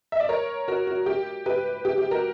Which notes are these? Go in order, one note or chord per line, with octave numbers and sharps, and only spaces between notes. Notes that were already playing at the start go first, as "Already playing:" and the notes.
E5
D5
A#4 C#5
F#4 A#4
F#4
G4
G4 B4
G4
G4
F#4 A#4